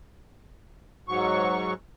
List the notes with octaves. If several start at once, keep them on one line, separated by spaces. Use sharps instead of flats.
G#2 F#3 C#6